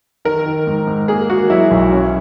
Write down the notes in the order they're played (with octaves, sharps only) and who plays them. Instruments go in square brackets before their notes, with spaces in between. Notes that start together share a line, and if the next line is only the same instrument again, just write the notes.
[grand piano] D#3 [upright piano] A#4
[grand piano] D#3
G#2
G#2
[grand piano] A#3 [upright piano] G#4
[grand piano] A#3 [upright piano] F#4
[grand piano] F#3 [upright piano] E4
[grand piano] B1
C#4